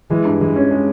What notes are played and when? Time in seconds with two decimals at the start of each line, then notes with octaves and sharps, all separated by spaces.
0.10 E3 G#3
0.25 G2
0.41 E3 G#3
0.56 C#4
0.71 G#3